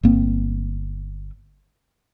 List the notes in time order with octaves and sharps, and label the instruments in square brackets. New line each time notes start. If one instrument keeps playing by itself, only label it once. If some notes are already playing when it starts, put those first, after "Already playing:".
[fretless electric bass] G1 A#3 C4